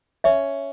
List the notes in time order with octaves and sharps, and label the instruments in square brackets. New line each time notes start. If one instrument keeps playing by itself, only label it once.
[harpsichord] C#4 [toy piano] E5